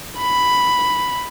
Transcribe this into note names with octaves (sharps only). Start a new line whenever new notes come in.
B5